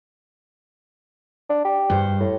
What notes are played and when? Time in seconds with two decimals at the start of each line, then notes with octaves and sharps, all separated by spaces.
1.50 D4
1.65 G4
1.90 G2 C5
2.20 A2